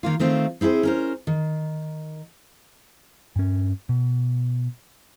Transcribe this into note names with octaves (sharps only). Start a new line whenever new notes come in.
D#3 A#3 F4
D#3 A3 C4 F4
C4 E4 G4 G#4 C5
C#4 A#4 C5
D#3
G2 C#4
B2